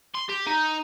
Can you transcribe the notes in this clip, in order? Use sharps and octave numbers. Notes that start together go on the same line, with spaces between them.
C6
G4
D#4